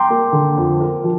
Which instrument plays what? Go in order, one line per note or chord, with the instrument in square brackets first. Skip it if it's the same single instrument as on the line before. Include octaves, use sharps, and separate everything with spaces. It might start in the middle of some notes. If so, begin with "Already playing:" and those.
Already playing: [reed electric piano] G5 A#5 C6 D6
[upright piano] A#3
D3
F2
A#4
F3